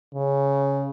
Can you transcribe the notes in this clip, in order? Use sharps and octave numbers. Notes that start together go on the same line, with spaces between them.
C#3